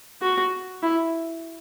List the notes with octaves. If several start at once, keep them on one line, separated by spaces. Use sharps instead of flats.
F#4
E4